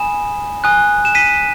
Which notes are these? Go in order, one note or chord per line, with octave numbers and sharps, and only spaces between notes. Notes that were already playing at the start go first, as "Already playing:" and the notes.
Already playing: G#5 B5 D#6 E7
G#5 D#6 F#6
E7
B6 D#7